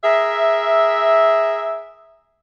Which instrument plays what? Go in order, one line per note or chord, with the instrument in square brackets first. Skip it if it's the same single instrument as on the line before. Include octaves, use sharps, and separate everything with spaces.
[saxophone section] G#4 A#4 E5